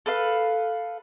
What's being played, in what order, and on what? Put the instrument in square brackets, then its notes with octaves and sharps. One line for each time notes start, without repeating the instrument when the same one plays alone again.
[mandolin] A4 B4 F5